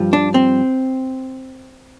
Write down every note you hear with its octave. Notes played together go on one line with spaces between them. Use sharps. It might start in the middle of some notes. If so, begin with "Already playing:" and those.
Already playing: G2 F3
D4
C4